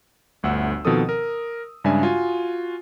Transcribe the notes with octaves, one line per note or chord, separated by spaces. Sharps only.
G1 D2 F#5 E6
B2 D#3 F3 C4 A4 D#6
A#4
G2 C#3 G#3 D4 E5 G#5
F4 F#4 G#5